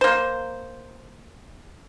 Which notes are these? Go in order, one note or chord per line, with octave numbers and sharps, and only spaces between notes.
A#3 C5